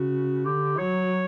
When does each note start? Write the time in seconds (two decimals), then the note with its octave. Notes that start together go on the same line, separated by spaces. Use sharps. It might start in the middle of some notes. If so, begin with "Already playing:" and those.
Already playing: C#3 F#4
0.45 D3 G4
0.78 F#3 C#5